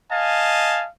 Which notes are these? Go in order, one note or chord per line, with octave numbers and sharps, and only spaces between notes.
D#5 F5 G#5 A5